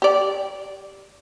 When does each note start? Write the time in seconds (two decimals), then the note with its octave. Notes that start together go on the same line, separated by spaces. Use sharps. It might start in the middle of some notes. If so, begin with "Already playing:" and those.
0.02 G4 D5